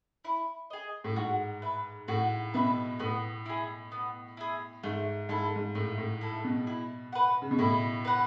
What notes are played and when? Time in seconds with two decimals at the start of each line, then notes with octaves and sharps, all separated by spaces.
0.25 E4
0.70 G#4 D#5
1.04 A2
1.16 G#2 F#4
1.62 B4 E5
2.08 A2 F#4
2.54 B2 B4 E5
3.00 A2 B3
3.46 E4 G#4
3.92 B3
4.37 E4 G#4
4.83 G#2 A3
5.29 G#2 E4 A4
5.56 G#2
5.75 A2 A3
5.98 A2
6.21 E4 A4
6.44 B2
6.67 E4
7.13 B4 F#5
7.42 C#3
7.51 B2
7.59 A2 E4
8.05 B4 F#5